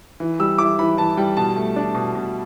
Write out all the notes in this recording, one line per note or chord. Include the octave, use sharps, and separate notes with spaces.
E3
G3 E6
E4 D6
E3 B5
E3 A5
G3 G5
B2 A5
A3
D4
B2
B2